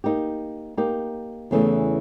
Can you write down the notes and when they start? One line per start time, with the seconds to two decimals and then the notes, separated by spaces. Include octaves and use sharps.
0.04 A#3 D#4 G4
0.77 A#3 D#4 G4
1.51 E2 C#3 E3 A3